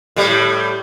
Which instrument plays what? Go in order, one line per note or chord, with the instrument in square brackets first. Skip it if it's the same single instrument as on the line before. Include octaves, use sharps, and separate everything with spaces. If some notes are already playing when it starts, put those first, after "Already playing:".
[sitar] A2 G3